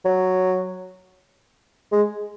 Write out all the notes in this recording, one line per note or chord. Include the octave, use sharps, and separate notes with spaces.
F#3
G#3